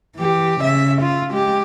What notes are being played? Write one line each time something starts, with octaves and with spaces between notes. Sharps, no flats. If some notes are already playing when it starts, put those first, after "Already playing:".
E3 G4
C#3 E5
F4
G#3 G4